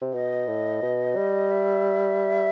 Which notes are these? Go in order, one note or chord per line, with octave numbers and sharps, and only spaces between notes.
C3
B2 D#5
A2
B2
G3
E5